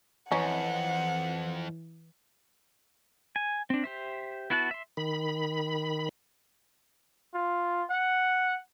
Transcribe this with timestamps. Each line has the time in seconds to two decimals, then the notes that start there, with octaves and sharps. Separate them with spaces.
0.32 F2 E3 C#4 D#4 F#5
3.36 G#5
3.70 C4 D4
3.84 G4 C5 E5
4.50 B3 E4 F#4 F#5 A5
4.71 E5 C6
4.97 D#3 B5
7.34 F4
7.90 F#5